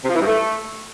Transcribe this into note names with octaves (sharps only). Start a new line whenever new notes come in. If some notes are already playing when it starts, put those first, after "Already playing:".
C3
F3
E3
G2
A3